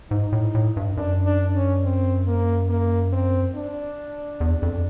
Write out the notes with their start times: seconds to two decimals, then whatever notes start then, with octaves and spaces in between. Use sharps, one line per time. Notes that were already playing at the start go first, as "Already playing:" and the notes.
0.11 G#2 D#4
0.32 A2
0.55 A2
0.77 G2
0.97 F#2 D4
1.26 D4
1.55 C#4
1.84 C4
2.27 A#3
2.69 A#3
3.12 C4
3.55 D4
4.40 E2
4.62 F2